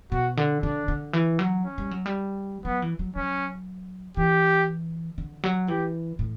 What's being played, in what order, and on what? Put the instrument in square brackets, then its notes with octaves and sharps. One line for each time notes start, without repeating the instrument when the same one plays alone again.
[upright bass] B2 [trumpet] F#4
[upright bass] D3
[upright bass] D3 [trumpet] D4
[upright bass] D3
E3
F#3
[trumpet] C#4
[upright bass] G3
F#3
G3
[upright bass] F#3 [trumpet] B3
[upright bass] E3
F#3
[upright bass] F#3 [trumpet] C#4
[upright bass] E3 [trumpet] G4
[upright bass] D3
F#3
[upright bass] E3 [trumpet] G4
[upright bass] A2